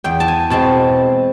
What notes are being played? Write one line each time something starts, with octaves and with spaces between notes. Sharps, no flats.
E2 G5
A5
G#5
B2 G#3 C4 A5